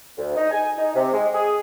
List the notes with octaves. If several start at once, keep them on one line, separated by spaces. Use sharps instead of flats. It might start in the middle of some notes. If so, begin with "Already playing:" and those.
D2
D#4
G#5
D#4
C3
G#3
G#4